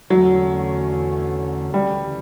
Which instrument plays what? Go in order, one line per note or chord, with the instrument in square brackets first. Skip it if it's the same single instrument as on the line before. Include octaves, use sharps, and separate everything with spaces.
[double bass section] E2 D3 A3 C#4 [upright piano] F#3
[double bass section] D2 C#3 E3 A3 [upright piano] G3